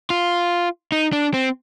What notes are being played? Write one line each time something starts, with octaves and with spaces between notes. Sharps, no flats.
F4
D#4
D4
C4